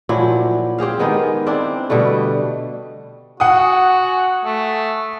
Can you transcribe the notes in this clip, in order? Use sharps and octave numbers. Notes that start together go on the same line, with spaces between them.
A#2 F3 F#3 E4
C4 G4 G#4 F5
D#3 G#3 B3 D#4
C4 D4 E4
B2 D3 G3 A3
F#4 F#5 G#5 D#6
A3